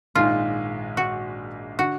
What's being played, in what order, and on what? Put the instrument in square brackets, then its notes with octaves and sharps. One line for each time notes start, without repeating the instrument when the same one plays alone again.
[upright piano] A#1 G#2 D#3 G#3 [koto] F4
[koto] F#4
[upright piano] D3 [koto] F#4